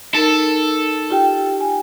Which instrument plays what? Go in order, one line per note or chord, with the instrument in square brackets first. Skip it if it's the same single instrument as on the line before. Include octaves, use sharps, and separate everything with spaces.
[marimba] D#4 A#4 [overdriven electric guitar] A4
[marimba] F4 G4 G5
G#5